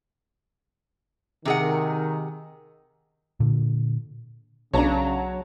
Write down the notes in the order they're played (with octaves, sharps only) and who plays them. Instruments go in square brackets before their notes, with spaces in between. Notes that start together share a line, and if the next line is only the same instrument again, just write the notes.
[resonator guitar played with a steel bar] C3 G#4 F#5 [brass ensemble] D#3
[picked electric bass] A#2 D3
[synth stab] B1 D4 [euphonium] C#3 [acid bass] F#3 [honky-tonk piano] C#5 A5 A#5